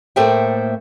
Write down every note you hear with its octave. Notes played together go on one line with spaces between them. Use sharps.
A2 A#3 A4 C5 E5 G5